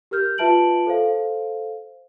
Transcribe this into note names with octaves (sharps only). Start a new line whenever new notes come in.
G4 A#4 F6 G6
F4 B4 E5 A5 D7 F#7
A4 C5 F5